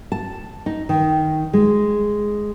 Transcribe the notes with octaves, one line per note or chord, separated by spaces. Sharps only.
A5
D#4
D#3
G#3